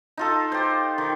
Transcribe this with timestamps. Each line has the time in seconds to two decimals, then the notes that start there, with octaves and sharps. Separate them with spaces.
0.17 D#4 F4 A4
0.52 G4 C5
0.98 D#3